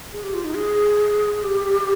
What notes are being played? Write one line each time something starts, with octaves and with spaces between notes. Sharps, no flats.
G#4
G4
F4
D#4
G#4
G4